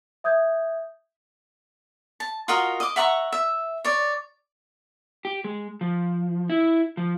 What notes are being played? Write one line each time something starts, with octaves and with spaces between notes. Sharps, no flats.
E5 D#6 G6 G#6
A5
F4 F#4 A#4 D#5
D#5 D6
E5 F#5 A#5 C#6
E5
C#5 D5
G4
G#3
F3
E4
F3